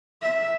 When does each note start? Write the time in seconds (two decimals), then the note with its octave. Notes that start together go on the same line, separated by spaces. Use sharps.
0.22 E5